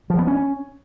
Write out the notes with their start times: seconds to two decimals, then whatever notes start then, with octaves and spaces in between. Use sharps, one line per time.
0.10 F3
0.19 B3
0.27 C#4